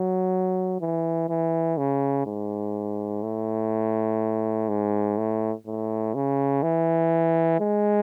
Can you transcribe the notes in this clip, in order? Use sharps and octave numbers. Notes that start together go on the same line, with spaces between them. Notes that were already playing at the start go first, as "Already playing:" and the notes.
Already playing: F#3
E3
E3
C#3
G#2
A2
G#2
A2
A2
C#3
E3
G#3